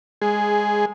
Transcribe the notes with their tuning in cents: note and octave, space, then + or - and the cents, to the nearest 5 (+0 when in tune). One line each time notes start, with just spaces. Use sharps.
G#3 -10 G#4 +5